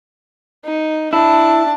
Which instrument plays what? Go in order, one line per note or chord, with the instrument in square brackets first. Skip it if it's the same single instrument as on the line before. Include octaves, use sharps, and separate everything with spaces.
[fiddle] D#4
[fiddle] D4 A5 [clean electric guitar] E4